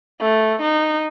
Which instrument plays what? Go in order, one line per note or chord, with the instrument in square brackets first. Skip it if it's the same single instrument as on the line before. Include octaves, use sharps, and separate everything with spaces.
[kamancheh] A3
D#4